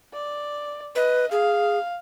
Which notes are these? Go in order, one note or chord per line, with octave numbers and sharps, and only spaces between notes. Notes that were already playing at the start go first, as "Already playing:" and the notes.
D5
B4 D#5
G#4 F5